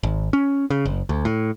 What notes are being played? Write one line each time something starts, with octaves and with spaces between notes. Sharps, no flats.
G#1
C#4
C#3
F#1
D2
A2